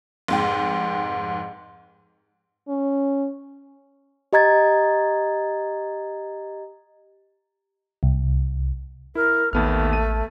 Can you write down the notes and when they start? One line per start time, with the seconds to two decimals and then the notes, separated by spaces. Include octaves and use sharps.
0.28 F1 G#2 G5
2.68 C#4
4.33 G4 D#5 A#5 G#6 A6
8.03 C2
9.15 E4 A#4
9.53 A1 D#2 A3 B3 F6
9.93 D#7